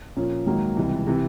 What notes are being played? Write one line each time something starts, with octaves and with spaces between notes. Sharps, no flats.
A#2 F3 A#3 C#4
G#2 D#3 F#3 A#3
C#2 C3 E3 G3
C3 E3